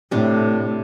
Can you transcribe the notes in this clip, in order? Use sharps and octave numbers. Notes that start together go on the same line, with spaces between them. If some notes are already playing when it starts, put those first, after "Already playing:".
A2 C3 D4